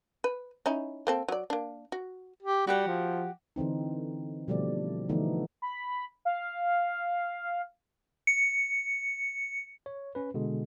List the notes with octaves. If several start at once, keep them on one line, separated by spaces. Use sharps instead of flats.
B4
C#4 D#4 E4
A#3 C4 A4
F#3 D5
A#3 D4
F#4
G4
G3 F#4 G4 F#5
F3
D3 E3 C4 D#4
B2 D3 F3 G3 A3 D5
D3 E3 F3 A3 B3 D#4
B5
F5
C#7
C#5
C#4 B4
B2 D3 G#3